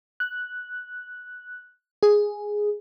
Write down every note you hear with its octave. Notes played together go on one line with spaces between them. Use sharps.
F#6
G#4